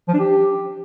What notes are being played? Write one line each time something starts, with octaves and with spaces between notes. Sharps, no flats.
F3
D4
G4